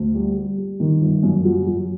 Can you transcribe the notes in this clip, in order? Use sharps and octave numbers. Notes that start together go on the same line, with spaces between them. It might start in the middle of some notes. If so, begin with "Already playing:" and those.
Already playing: D2
G3
G3
G3
D#3
G1
F#2
F#3
F#3